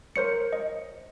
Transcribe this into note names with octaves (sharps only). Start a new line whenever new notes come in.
A#4 C5 C#5 C#7
D#5